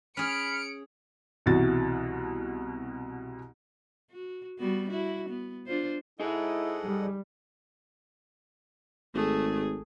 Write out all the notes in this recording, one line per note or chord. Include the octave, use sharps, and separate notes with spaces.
C#4 G#4 B5 F6 C#7 D7
C2 B2 E3 F#4 A6
F#4
G3 B3 F#4
E4 F#4
B3
D4 F4 C5
D#4 E4 G#4 A4 D#5 F#5
G3
G#1 A3 G#4